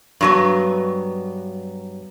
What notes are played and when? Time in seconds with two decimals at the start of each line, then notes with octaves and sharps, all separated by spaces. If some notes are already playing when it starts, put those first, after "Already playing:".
0.21 G2 F#3 B3